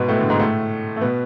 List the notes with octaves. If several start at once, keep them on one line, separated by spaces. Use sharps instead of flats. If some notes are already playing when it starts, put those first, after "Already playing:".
Already playing: G#2 B2 G#3 B3
A2 A3
D3
G#2 G#3
A2 A3
A3
B2 B3